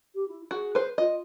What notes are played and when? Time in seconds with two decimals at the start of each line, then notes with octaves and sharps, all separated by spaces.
0.14 G4
0.27 E4
0.51 F#4 G#4
0.75 B4 C5
0.98 F4 D#5